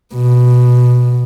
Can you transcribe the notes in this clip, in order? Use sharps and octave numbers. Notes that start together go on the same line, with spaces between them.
B2